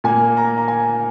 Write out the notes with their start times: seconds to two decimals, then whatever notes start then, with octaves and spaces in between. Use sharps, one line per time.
0.04 A#2 A#3 G#5
0.37 A#5
0.58 A#5
0.68 G#5